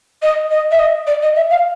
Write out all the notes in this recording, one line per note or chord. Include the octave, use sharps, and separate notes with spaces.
D#5
D#5
E5
D#5
D5
D#5
E5
F5